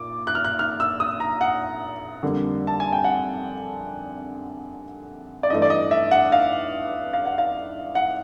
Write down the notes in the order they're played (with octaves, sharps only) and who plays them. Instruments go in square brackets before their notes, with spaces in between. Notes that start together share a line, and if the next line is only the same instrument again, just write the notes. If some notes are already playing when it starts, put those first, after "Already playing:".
Already playing: [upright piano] A#2 D6
F#6
F6
F#6
F6
E6
D#6
A#5
F#5
F2 D3 G3 A#3
A5
G#5
G5
F#5
D5
G2 E3 A3 D#5
D5
D#5
E5
F#5
F5
F5
F#5
F5
F#5